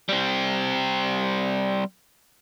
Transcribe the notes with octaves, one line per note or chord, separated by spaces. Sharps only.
G3 C4